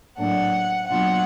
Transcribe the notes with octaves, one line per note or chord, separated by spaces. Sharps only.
A2 F#3 A#3 D4 F#5
B2 F#3 A#3 D4 F4 F#5